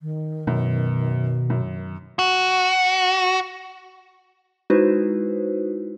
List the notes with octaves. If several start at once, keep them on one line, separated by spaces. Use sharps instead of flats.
D#3
F#2 B2
F#2
F#4
G#3 D#4 E4 F#4 B4 C5